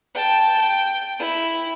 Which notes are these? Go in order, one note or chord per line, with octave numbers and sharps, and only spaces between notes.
G5 A5
G5
E4